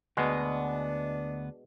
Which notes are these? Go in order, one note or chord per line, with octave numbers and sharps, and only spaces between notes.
D2 B2 G#3 B3 D4